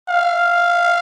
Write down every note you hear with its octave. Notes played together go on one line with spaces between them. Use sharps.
F5